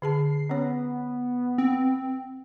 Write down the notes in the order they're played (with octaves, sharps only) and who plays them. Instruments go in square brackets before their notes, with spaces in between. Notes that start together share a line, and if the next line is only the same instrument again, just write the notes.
[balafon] D3 G#4 A5 [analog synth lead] C7
[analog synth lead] B3 [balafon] C#4 C#5
[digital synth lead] C4